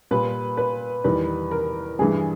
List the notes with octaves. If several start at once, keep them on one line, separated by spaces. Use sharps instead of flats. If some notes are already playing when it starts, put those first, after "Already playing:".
A#2 G3 B4
B4
E2 D#3 G3 B4
A#4
G2 E3 G3 G#4